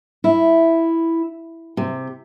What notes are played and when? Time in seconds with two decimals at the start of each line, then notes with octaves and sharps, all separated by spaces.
0.24 E4
1.77 C3